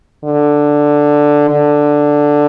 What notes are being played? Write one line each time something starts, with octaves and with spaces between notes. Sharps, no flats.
D3
D3